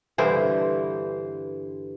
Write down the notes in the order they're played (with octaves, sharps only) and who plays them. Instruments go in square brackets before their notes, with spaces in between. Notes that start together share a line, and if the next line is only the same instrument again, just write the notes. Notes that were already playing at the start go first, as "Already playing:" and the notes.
[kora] G2 D3 E3 C5